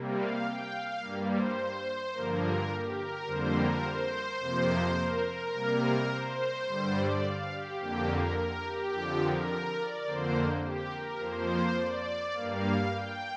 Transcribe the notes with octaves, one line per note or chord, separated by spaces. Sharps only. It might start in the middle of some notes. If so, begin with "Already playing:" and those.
Already playing: C3 G3 A#3
F5
G5
F5
G2 G3 A#3
C5
G2 D3 F3 A#3 A#4
A#4
G4
A#4
F2 D3 G3 A#3 C5
A#4
C5
F2 C3 F3 A#3
A#4
A#4
C3 G3 A#3
C5
G2 D3 G3
D5
F5
G4
F2 D3 A#3 G4
A#4
A#4
G4
F2 D3 F3
A#4
D5
F2 D3 A#3 C5
G4
A#4
F2 F3 A#3 C5
D5
G2 G3 A#3 F5
G5